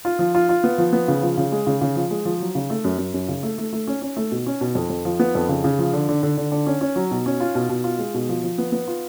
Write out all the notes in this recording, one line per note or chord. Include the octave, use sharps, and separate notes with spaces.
F4
F3
F4
F4
B3
F3
B3
C#3
F3
C#3
G#3
C#3
C#3
F3
G#3
F3
F#3
C#3
A3
F#2
F#2
F#2
C#3
A3
A3
A3
C#4
C#4
A3
B2
C#4
B2
F2
F2
F3
B3
F2
C#3
C#3
F3
D3
D3
D3
D3
D3
C#4
C#4
F#3
B2
C#4
F4
B2
B2
F4
G#3
B2
F3
F3
B3
B3
F4